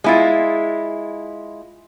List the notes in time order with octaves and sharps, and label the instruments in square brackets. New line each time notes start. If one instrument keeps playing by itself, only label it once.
[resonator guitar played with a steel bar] G#3 E4 F4